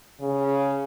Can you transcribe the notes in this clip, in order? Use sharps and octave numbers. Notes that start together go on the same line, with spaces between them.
C#3